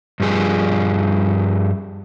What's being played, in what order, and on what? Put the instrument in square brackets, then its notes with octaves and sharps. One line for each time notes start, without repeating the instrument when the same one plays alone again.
[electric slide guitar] G2 F3 G3 G#4